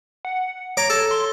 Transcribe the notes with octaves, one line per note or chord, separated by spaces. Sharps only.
F#5
C#5 A#5 D6
A4
C6